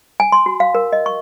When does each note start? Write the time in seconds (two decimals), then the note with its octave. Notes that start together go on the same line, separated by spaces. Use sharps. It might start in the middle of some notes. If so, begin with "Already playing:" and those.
0.20 G#5
0.32 C6
0.46 F#4
0.60 F5
0.75 A#4
0.93 D#5
1.06 C#6